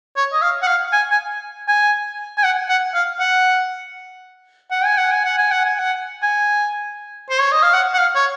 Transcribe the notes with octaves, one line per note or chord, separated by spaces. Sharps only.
C#5
D#5
F5
F#5
F5
G#5
G#5
G#5
G#5
F#5
F#5
F5
F#5
F#5
G#5
F#5
G#5
F#5
G#5
F#5
G#5
F#5
G#5
C5
C#5
D#5
F5
F#5
F#5
F5
C#5